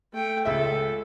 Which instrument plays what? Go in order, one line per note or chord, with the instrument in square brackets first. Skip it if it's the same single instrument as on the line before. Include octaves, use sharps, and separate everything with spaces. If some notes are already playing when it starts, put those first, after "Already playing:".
[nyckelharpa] A3 G5
[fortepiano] C#2 G#3 E5 [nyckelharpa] A4